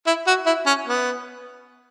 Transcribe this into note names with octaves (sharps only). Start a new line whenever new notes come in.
E4
F#4
E4
C#4
B3